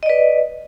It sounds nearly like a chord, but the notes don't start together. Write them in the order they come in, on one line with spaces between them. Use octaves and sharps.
D#5 D5 B4